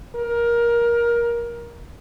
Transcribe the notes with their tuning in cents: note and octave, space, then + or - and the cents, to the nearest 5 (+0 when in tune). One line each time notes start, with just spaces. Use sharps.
A#4 +20